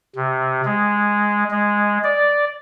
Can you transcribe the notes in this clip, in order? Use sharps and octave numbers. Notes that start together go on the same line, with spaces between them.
C3
G#3
G#3
D5